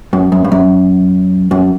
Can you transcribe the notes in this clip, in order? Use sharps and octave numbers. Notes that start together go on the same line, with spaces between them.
F#2
F#2
G2
F#2
F#2